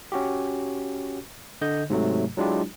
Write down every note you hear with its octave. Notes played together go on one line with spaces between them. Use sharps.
C#4 F#4 G4
D3 D#5 G6
G#2 C3 F#3 A3
F#3 G#3 D4 E4 F4 G4